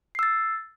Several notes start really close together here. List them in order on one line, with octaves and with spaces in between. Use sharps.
C7 E6 A6